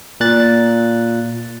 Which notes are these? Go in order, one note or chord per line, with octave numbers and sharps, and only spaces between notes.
A#2 F#6 A6